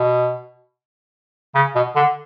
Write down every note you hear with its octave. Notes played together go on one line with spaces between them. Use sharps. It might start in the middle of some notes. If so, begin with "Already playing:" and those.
Already playing: B2
C#3
B2
D3